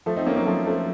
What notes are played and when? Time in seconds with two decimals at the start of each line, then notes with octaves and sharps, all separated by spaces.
0.06 F3 A3
0.16 C4 D#4
0.26 A#3 C#4
0.36 F#3 A#3
0.46 F3 A3
0.66 F3 A3